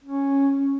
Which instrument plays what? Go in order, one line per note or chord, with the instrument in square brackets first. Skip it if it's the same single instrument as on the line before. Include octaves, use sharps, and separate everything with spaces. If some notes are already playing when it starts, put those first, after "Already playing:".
[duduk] C#4